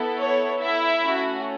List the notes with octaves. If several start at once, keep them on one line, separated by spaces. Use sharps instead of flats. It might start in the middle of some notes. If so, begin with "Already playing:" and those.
Already playing: B3 E4 A4
C#5
E4 E5
A3 C#4 F#4